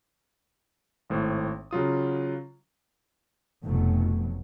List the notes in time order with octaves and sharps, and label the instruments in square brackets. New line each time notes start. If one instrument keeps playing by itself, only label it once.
[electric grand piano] G#1 A2 C5
C#3 F#3 F4 D#6
[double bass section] F1 F2 B2 F#3 A3